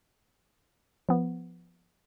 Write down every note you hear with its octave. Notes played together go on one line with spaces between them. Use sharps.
F3 B3